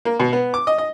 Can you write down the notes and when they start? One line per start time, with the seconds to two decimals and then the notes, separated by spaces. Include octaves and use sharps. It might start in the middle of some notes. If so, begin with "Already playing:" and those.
0.05 A#3
0.20 B2
0.33 B3
0.54 D6
0.67 D#5
0.78 D#5